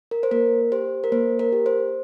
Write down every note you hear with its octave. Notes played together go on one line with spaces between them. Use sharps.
A#4
C5
A#3 A#4
G4 C5
A#4
A#3 C5
A#4
G4
C5